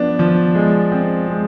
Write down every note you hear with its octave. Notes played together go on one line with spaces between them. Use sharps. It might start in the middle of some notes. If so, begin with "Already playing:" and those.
Already playing: F3 B3 D4
F3
G#3
C4
G#3